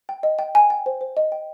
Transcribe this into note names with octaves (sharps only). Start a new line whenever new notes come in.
G5
D#5
G5
G5 G#5
G5
C5
C5
D#5
G5